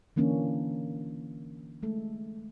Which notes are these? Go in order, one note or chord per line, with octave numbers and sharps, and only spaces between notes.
D3 E3 A#3 C#4 D4
G#3 A3 A4